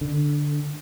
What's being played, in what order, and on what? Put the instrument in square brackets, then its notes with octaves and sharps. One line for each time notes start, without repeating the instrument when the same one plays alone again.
[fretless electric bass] D3